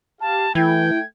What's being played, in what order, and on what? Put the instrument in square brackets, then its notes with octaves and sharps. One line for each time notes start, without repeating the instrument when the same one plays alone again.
[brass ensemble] G4 F5 [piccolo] A5
[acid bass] E3 [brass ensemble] A3 G5 [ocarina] E4 [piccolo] G#6